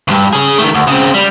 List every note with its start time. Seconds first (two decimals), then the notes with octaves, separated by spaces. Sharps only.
0.08 C#2 G2
0.33 C#4 G#4
0.58 D#3 A3
0.75 D2
0.87 C#3 C4
1.14 G3